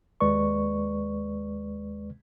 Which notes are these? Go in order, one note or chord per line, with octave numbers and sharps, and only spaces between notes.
D#2 G#3 B4 D5 C#6